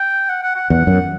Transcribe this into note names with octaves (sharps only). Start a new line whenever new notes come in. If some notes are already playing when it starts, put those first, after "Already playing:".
Already playing: G5
F#5
F#5
F#5
E2 F#5
F#2